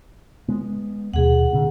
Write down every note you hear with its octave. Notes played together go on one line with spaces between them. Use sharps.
G#3 B3
D#2 B2 G#4 F#5
A#2 D3 C4